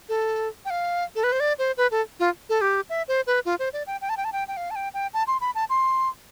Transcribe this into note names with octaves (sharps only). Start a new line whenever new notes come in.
A4
G5
F5
A4
B4
C5
D5
C5
B4
A4
F4
A4
G4
E5
C5
B4
F4
C5
D5
G5
G5
A5
G5
A5
G5
G5
F5
A5
G5
G5
A5
C6
B5
A5
C6